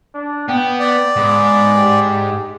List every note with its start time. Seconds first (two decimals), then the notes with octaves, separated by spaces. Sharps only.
0.14 D4
0.49 B3 G5
0.80 D5
1.16 G#2 B3
1.77 G4